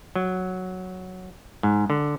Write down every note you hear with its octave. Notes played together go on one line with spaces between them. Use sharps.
F#3
G#2
D3